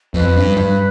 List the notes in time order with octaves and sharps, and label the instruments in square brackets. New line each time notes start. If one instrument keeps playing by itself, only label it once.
[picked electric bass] F2 [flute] B4
[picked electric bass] G2
G2